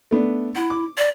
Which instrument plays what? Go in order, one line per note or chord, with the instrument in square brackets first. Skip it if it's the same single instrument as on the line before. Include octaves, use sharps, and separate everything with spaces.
[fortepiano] A3 B3 D4
[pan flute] E4 [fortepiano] F#5
[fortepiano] D6
[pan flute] D5